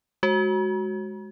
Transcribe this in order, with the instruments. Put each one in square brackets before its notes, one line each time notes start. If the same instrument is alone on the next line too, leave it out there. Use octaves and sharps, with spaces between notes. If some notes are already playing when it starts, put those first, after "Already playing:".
[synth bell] G#3 F#4